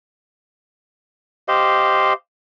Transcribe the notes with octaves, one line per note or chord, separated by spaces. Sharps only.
G4 C5 D#5 F5